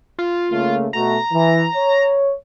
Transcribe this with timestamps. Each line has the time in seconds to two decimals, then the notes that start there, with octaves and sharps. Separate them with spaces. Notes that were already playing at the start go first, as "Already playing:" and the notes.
0.19 F4
0.51 C#3 A3 A#3
0.93 B2 A3 F#4 A#5
1.32 E3
1.75 C#5